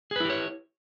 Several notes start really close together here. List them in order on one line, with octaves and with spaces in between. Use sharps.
G#4 B4 E4 G4 C#5